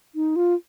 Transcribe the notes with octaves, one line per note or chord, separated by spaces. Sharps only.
D#4
F4